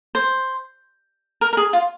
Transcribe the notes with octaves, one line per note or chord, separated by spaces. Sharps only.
C5
A#4
A#4
G#4
F4